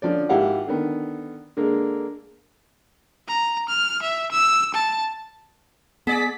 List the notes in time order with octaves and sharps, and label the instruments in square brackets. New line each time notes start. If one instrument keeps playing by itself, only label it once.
[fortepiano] D3 F3 C#4 D5
G#1 E4 G4 F5 F#5
D3 D#3 B3
D3 G#3 A#3
[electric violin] A#5
F6
E5
E6
A5
[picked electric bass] B3 [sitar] G#4 D5 [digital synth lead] B6